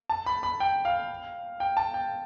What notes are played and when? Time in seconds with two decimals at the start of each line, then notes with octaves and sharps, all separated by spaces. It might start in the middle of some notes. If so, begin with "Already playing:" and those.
0.09 A5
0.26 B5
0.43 B5
0.60 G5
0.85 F5
1.60 G5
1.77 A5
1.94 G5